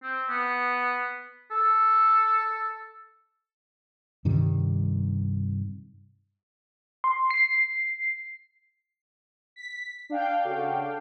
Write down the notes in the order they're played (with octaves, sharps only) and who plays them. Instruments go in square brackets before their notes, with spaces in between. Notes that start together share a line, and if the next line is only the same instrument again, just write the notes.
[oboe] C4
B3
A4
[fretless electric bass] G2 C3 D#3 G3
[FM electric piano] C6
C7
[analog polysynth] B6
D4 F5 G5
[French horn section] C#3 F#4 A4